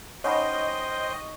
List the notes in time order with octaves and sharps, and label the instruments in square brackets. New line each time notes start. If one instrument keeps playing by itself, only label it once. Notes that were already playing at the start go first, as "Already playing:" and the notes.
[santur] C#4 D#4 [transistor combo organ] C5 G5 [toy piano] C#5 F#5 B5 [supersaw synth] D#5